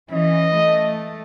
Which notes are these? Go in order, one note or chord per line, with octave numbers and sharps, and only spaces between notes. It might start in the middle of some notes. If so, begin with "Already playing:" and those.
E3 C#4 D#5
A3